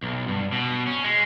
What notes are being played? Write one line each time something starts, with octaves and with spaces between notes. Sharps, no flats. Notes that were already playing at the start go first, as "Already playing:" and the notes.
B1
G2
B2
C#4
G#3